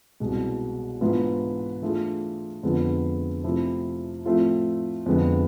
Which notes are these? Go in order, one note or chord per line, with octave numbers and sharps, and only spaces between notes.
C2 B2 G#3
G#2 E3 B3 D4 F4
E3 A3 D4 F4 G#4
F2 D3 G#3 B3 F4
C3 F3 A3 E4
A2 F3 A3 C4 F4
F2 D3 G#3 B3